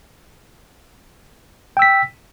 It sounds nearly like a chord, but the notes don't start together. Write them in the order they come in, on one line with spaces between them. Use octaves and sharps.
G5 E6 B6